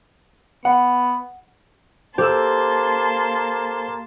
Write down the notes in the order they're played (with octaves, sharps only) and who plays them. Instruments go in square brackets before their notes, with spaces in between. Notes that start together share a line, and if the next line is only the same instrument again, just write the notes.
[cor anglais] B3 [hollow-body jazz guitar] F#5
[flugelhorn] A#3 [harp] G4 E6 [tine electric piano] A4 C5 [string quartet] A5 C6